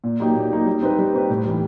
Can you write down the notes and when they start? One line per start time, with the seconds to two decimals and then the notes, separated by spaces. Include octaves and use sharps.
0.04 A#2
0.20 F#3 A#3 D#4 G4
0.35 A#2
0.51 F#3 A#3 D#4 G4
0.66 G3
0.82 C4 D#4 G4 B4
0.99 G3
1.14 C4 D#4 G4 B4
1.30 A2
1.46 E3 G3